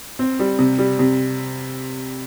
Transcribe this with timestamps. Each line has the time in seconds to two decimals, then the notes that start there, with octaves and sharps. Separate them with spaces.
0.19 C4
0.39 G3
0.59 C3
0.78 G3
0.99 C3